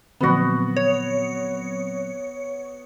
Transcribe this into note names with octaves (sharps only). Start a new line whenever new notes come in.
A#2 D3 F3 F#3 B3 C4 F#4
C#5